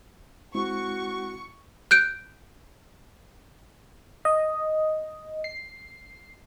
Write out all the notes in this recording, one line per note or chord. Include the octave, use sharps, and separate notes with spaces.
G#3 C4 E4 F#4 C#6
F#6 G6 D7
D#5
C7